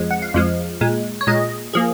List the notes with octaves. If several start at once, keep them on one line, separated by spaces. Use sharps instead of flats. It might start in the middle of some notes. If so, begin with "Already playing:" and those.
Already playing: F2 F3 G#3
F#5
F5
F2 F3 G#3
A#2 G#3
C#5
A#2 G#3 D#5
F3 A#3 G#4